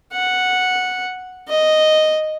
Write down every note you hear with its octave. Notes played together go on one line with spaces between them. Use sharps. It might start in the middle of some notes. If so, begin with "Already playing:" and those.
F#5
D#5